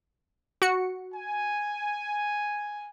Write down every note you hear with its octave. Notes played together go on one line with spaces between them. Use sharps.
F#4 C#7
G#5